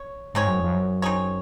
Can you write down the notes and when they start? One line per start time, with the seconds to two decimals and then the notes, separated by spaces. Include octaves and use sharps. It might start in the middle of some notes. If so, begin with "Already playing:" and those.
Already playing: C#5
0.34 G#2 C4 D#4 G#4 C#5
0.47 F#2
0.60 F2
0.73 F#2
1.02 C4 D#4 G#4 C#5